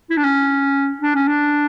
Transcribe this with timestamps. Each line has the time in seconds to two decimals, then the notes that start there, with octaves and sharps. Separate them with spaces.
0.10 E4
0.17 D4
0.24 C#4
1.02 D4
1.15 C#4
1.28 D4